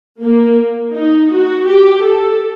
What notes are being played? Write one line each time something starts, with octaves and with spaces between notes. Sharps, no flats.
A#3
D#4
F#4
G4
A4